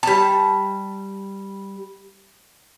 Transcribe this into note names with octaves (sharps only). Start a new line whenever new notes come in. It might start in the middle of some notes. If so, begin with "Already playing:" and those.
G3 A5